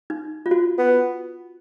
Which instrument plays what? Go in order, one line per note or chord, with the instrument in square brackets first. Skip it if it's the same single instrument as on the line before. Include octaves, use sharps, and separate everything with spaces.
[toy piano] D#4
F4
F#4
[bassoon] B3